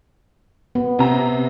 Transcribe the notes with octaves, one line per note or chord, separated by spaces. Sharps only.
B3
C3 A#5